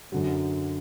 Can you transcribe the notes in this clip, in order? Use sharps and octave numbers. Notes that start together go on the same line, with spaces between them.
F#2 D3 F#3